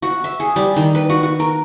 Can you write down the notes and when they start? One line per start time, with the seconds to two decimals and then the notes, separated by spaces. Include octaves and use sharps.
0.02 F#4
0.24 E5
0.40 G#4
0.56 G3
0.76 D#3
0.95 B4
1.10 F#4
1.23 F#4
1.40 A#4